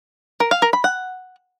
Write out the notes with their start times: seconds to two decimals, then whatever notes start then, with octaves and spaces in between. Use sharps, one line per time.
0.40 A#4
0.51 F5
0.62 A#4
0.73 B5
0.84 F#5